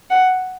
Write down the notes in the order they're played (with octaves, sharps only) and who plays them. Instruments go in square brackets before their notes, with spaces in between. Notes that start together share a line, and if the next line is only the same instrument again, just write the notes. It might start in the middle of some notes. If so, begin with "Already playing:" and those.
[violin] F#5